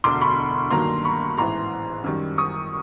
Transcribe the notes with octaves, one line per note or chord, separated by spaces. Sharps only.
E1 D2 D3 C6 D6
B5 C#6
G2 D#3 F#3 A#3 A#5 C6
B5 C#6
A1 G#2 E3 A#5 C6
F#2 D#3 G3
C#6 D#6